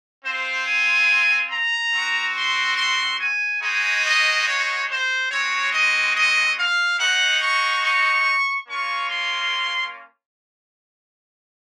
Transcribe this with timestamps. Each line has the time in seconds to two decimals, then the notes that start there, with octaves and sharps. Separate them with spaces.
0.24 C4 F4 C5
0.66 G#5
1.51 A#5
1.93 C4 F#4
2.35 C6
2.77 C6
3.19 G#5
3.61 G#3 D#4 F#4 G#5
4.04 D#5
4.46 C#5
4.89 C5
5.30 G#3 C4 F#4 C#5
5.72 D#5
6.15 D#5
6.57 F5
6.99 G#3 D#4 F#4 F#5
7.41 C#6
7.84 C#6
8.68 A#3 C#4 F4 C#6
9.09 C6